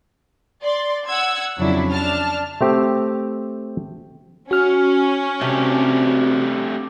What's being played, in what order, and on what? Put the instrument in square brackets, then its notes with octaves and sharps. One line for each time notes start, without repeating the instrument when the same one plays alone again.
[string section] D5 C6
F#5 E6 G#6
F2 C#3 F#3 D4 E4
D4 A5 F6
[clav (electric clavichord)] A3 C4 G4
[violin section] C#4 [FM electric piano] F#4 F6
[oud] C3 [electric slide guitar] A3 D4 G4